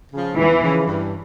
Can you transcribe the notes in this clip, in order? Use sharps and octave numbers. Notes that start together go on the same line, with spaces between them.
C#3 F3
E2 E3
C#3 F3
G2